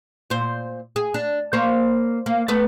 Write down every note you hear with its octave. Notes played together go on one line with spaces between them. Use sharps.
A#2 C5
G#4
D4
A#3 C5 C#5
A#3
A3 B3 B4